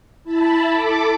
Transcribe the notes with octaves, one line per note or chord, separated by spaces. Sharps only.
E4 A5 B5
A4 D6